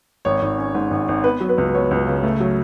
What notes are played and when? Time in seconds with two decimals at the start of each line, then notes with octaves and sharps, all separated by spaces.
0.25 G#1 C#5
0.42 G#1
0.58 C#4
0.74 G#2
0.91 G#1
1.09 G#1
1.24 B3 B4
1.40 F#3
1.49 B4
1.58 C#2
1.75 B3 C#5
1.91 C#2
2.07 C#3
2.23 A3
2.40 F#3